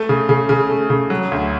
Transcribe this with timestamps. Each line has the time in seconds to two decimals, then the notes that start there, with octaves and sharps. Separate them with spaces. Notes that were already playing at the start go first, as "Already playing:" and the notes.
Already playing: A3
0.09 C#3
0.29 C#3
0.49 C#3
0.70 A3
0.90 C#3
1.10 F#3
1.32 D2